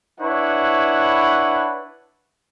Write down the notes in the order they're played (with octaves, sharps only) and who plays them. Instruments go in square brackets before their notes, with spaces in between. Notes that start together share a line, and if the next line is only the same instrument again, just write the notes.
[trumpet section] D4 E4 B4 C#5 F#5 C#6